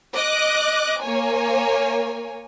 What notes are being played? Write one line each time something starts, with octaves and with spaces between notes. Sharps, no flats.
D#5 D6 F#6
A#3 C#5 G#5